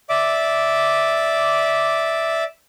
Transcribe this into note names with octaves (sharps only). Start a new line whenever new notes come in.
D5 E5 D6